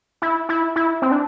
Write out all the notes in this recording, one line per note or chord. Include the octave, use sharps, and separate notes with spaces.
E4
E4
E4
C4
D4